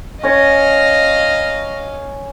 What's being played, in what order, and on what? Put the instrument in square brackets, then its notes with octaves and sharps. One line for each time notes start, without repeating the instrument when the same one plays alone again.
[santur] C#4 C#5 [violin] D#5 F5 [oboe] A#5